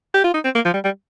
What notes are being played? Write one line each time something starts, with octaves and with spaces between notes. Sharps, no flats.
G4
F4
D#4
C4
A#3
F3
G3
G3